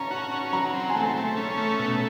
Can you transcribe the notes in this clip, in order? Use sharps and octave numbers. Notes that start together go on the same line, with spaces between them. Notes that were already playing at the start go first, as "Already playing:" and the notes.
Already playing: C#4 A5 A#5
F#4
C#4
F#3 A#5
C4
G#5
A3 A5
A3
C#4
A3
B2